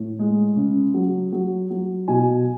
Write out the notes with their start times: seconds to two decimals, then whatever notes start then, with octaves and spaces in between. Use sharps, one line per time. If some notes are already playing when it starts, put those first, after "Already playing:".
Already playing: A2
0.19 G#3
0.56 C#3
0.94 F#3
1.32 F#3
1.71 F#3
2.08 B2 G#5